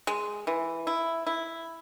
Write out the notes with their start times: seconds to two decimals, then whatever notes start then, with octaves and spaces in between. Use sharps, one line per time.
0.07 G#3
0.47 E3
0.87 E4
1.27 E4